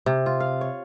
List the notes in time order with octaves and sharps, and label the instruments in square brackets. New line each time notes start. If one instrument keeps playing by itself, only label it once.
[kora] C3
F4
F5
C#5